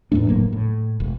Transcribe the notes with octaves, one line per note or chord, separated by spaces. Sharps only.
E2 A2 A3 D4
F1 A2 F#3 A#3
A2
E1